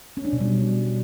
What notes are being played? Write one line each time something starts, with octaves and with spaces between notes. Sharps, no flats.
C#4
D4
B2
G3